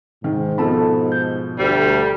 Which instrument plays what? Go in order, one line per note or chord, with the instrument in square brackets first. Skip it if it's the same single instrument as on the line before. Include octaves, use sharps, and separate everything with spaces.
[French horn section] G#2 [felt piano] D#3
[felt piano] B2 F3 [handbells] A4 A5 B5
[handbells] G6
[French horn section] D2 [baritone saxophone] G3